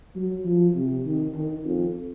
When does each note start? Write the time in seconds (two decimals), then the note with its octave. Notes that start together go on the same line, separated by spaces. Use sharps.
0.16 F#3
0.45 F3
0.75 C3
1.05 D#3
1.34 D#3
1.65 F2